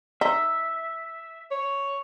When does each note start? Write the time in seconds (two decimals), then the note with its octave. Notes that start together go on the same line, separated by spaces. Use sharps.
0.21 D#4 E5
1.51 C#5